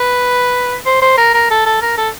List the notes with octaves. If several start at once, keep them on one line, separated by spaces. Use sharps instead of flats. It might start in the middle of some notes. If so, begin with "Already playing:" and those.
Already playing: B4
C5
C5
A#4
A#4
A4
A4
A#4
A4